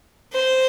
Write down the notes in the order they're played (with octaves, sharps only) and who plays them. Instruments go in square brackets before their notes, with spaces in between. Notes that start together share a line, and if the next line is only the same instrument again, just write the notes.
[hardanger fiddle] C5